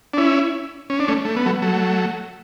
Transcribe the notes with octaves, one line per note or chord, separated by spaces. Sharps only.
D4
C#4 E4
C#4
D4
A3 C#4
A3
B3
F#3 A3
F#3 A3